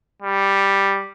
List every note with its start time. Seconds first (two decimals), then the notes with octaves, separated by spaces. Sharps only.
0.22 G3